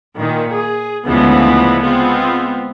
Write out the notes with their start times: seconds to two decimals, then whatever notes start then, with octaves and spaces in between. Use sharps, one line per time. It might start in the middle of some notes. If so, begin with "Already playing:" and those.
0.16 A#2 D#3
0.52 G#4
1.05 D2 C#3 E3 F3 G#3 B3
1.82 G#3 B3 C4 F4